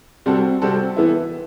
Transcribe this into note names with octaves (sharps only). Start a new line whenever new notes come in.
C3 G3 C4 F#4 A4
C3 G3 C4 F#4 A4
E3 B3 E4